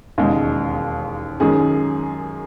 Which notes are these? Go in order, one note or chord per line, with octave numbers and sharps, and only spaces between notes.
E1 D#2 C#3 G#3
F#2 D#3 G#3 C#4 G#4